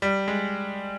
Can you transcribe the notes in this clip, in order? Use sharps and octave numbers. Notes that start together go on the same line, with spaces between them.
G3
G#3